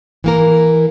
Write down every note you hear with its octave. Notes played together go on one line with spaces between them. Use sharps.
E3 A#3 A#4